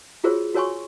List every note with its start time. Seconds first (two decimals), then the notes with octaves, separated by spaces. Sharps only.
0.24 F4 F#4 G#4 A#4 C5 C#5
0.55 F#4 A#4 C#5 G#5 C6 C#6